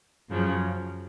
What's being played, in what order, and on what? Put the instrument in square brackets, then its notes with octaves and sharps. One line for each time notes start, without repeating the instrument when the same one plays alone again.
[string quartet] F#2 C#3 F3